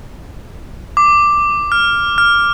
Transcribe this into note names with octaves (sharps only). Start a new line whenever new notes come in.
D6
F6
F6